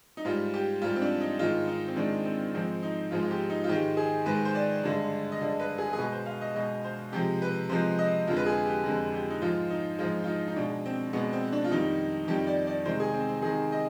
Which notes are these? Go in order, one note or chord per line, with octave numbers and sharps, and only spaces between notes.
D#4
G#2 G3 F4
G4
G#2 G3 F4
C4
D4
D#4
G#2 D#3 G#3 F4
D#4
C4
G#2 D#3 G#3 D4
C4
G#2 F3 G#3 C4
D#4
G#2 F3 G#3 F4
F4
G4
D#4
F4
G#2 D#3 G#3 G4
G#4
G#2 D#3 G#3 B4
C5
D5
G2 D3 G#3 D5
D#5
G2 D3 G#3 D5
B4
G#4
G#4
B2 G#3 B4
C5
F5
D#5
B2 G#3 D#5
C5
C3 F3 G#3 G4
B4
C3 F3 G#3 C5
D#5
F2 D3 G#3 F4
B4
G#4
G4
F2 D3 G#3
G4
D#4
G#2 F3 G#3 F4
D#4
G#2 F3 G#3 F4
F4
D#4
D#4
B2 G#3 D4
C4
B2 G#3 B3
C4
D4
F4
F2 D#3 G3 D#4
F2 D#3 G3 G4
D5
D5
C3 D#3 G#3 C5
G#4
C4
C4
C3 D#3 G#3 G#4
D#5